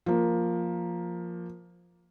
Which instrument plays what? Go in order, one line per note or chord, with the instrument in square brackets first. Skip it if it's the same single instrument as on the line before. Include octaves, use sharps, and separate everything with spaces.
[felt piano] F3 A#3